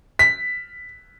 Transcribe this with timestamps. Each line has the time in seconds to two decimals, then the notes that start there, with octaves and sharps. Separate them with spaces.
0.19 B6